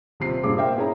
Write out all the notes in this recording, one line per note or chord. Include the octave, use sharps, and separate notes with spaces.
D#1 C3 F4 C7
G2 A#2 C#4 G#4 D6
A#4 C5 E5 F5 G5
B3 E4 G#4 C#5 A#5